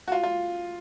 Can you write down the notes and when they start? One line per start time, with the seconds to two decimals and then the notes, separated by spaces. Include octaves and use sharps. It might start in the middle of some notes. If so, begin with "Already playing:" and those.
0.08 F#4
0.12 F4
0.23 F4